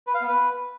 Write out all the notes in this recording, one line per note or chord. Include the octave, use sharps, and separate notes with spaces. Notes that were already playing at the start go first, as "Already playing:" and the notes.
B4
F5
B3
B4